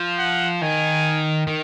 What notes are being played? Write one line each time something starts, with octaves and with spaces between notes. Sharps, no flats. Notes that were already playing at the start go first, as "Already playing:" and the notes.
Already playing: F3
F#5
D#3 G#5
D#3